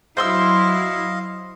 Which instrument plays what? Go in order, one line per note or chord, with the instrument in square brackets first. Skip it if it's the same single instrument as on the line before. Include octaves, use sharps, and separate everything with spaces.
[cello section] F#3 E4 [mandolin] C5 C6 E6 [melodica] D#5 F5